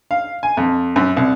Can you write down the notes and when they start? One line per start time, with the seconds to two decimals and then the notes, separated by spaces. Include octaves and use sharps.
0.11 F5
0.43 G#5
0.57 F2
0.96 F#2
1.17 C2